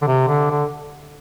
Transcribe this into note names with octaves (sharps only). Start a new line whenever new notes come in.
D3
C3
D3
D3